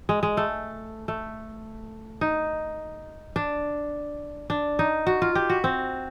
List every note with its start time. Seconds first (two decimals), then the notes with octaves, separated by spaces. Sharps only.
0.09 G#3
0.23 G#3
0.37 A3
1.08 A3
2.21 D#4
3.36 D4
4.50 D4
4.79 D#4
5.07 F#4
5.22 F4
5.35 G4
5.50 F#4
5.64 C4